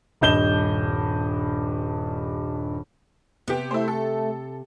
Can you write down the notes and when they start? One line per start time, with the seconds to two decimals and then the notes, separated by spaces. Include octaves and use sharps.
0.21 D#1 G2 D#5 G6 E7 G7
3.48 C3 B3 G4
3.71 A3 E4 C5
3.88 A4